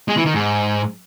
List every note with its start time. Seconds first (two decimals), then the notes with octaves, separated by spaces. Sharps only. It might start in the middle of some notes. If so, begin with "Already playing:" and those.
0.08 G#3
0.17 E3
0.26 D#3
0.34 G#2